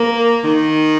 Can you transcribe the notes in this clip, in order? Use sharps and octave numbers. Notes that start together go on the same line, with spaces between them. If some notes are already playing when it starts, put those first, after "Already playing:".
Already playing: A#3
D#3